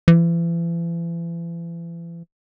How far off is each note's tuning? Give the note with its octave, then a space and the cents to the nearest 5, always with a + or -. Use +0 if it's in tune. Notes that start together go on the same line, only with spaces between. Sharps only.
E3 +40